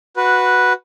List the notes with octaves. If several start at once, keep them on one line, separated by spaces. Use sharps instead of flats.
F#4 B4